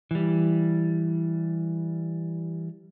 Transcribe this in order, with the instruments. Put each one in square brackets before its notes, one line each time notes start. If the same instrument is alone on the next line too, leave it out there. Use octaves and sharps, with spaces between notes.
[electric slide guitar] E3 G3